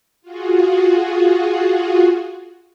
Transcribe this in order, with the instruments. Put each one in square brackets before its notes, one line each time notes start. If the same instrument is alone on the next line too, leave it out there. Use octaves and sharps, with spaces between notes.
[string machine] F4 F#4 G#4